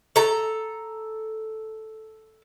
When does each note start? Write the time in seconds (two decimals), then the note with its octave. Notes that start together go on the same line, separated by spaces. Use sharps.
0.16 A4 A#5